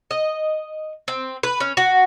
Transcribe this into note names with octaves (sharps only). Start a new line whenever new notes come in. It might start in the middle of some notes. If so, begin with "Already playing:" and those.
D#5
C4
B4
C#4
F#4